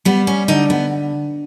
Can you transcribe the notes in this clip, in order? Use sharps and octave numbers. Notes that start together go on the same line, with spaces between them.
G3 B3
C#4
D3 D#4
B3